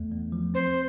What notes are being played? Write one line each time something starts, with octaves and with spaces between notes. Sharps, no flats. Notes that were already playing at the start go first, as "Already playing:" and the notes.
Already playing: E2 A3
E2
F3
C4 C5